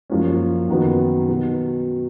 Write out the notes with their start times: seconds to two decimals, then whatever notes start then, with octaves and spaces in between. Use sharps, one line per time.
0.10 F#2 F3 A#3 C#4
0.69 F#2 D#3 F#3 B3
1.29 B2